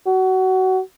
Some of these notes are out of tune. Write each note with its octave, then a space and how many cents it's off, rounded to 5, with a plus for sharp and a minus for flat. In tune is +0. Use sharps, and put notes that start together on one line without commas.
F#4 +25